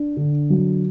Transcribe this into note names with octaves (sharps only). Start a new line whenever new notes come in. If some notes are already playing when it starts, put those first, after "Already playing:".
Already playing: D4
D3
F#3